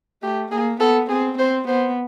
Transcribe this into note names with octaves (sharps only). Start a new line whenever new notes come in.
A3 G4
A#3 G#4
B3 A4
C4 G#4
C4 C5
B3 C5